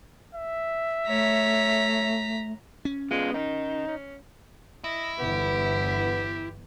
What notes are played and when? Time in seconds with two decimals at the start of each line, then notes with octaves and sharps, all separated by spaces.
0.35 E5
1.08 A3 C#5 A#5 B6
2.85 C#4
3.11 G#3 B3 F4
3.34 D#3 D#4
3.87 C#4
4.84 E4 D#5
5.19 G1 E2 E3 B3 G4